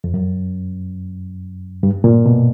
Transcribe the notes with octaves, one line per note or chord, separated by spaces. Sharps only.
F2
F#2
G2
A#2
B2